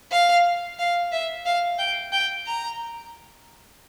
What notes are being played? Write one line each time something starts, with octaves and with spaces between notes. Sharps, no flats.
F5
F5
E5
F5
G5
G5
A#5